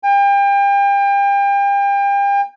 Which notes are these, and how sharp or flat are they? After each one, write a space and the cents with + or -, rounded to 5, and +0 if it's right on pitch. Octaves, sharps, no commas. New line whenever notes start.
G5 +35